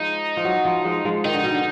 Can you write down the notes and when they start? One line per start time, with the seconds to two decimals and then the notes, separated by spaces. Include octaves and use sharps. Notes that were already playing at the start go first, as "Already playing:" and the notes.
Already playing: F3 G#3 D#4
0.37 F3
0.45 F#3
0.65 F3
0.85 F3 G#3
1.05 F3 G#3
1.25 D#3 D#4
1.34 D3
1.44 B2
1.53 D3